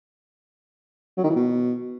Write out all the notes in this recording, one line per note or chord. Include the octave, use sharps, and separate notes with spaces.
F#3
D#3
E3
B2